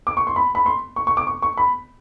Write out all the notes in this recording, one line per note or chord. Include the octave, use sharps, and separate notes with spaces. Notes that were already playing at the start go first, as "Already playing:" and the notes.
D6
C#6
C6
B5
B5
C6
C#6
C#6
D6
C#6
C#6
B5